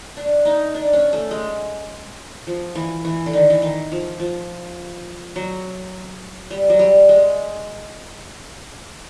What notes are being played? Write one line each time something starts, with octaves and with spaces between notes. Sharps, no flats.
D4
D#4
D4
C#4
A3
G#3
F3
E3
E3
D3
D#3
E3
D#3
F3
F3
F#3
G3
F#3
G3
G#3